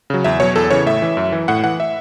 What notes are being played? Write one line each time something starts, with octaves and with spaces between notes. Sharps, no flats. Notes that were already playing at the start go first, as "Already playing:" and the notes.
C#3 F#3
E2 E5
B2 F#3 C#5
E2 A4
C#3 E3 C#5
A2 E5
E3
F#2
E3
A2 F#5
E3 F#5
E5